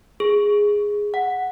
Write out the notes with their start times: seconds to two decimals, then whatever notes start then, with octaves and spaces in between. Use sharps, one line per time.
0.20 G#4
1.14 F#5